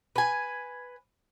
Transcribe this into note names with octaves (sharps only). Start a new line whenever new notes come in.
B4 G#5